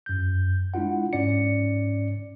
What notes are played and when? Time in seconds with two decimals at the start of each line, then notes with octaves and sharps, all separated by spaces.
0.06 F#2 G6
0.74 G#3 D4 E4 F4 F#5
1.13 G#2 C#4 D5 C#7